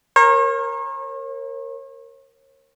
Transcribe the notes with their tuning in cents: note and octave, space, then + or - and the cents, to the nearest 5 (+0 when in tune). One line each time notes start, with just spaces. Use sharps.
A#4 +0 C#5 -40